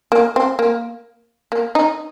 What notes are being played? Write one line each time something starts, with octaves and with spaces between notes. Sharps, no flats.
A#3
C4
A#3
A#3
D#4